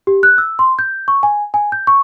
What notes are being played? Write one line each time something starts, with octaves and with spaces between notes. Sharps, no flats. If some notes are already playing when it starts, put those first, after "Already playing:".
G4
F#6
E6
C6
G6
C#6
G#5
G#5
G6
C#6